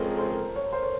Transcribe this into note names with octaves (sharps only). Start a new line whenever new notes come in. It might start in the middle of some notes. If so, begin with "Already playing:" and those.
Already playing: F2 C#3 F3 G#3 C4 A4 A#4
C5
C#5
C5
C#5